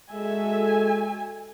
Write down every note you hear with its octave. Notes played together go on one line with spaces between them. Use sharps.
G#3 F#4 A4 E5 G#5